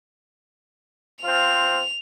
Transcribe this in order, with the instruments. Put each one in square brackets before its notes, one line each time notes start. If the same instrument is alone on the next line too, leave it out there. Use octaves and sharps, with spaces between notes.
[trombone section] F3 C4 F4 [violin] F7